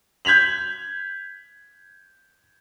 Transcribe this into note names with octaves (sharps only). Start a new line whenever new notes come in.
G6 G#6 B6 F7 F#7